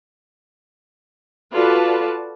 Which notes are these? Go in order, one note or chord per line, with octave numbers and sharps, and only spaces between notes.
F4 F#4 A4 B4 D5 A5